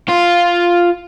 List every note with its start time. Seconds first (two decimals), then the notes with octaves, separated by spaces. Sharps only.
0.09 F4